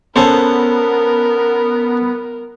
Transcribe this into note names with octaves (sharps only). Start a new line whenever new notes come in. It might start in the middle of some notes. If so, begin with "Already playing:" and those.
B3 C#4 A4 A#4 C5